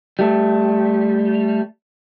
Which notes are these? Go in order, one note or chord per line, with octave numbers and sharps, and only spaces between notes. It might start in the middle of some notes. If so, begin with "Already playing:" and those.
G3 A3